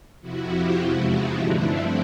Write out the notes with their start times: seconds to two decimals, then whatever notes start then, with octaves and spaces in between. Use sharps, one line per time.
0.21 F2 C3 F3 E4 F#4
0.49 F4 G4
0.77 E2 C3 F3 G#3 E4 F#4
1.05 D#4 F4
1.34 G2 D3 F3 A3 D4 E4
1.62 C4